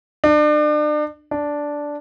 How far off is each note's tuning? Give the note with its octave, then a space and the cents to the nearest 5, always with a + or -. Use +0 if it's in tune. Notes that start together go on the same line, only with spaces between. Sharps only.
D4 +35
D4 -5